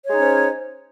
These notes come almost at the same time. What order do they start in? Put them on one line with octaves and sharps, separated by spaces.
C#5 G#3 D#4 C#4 C5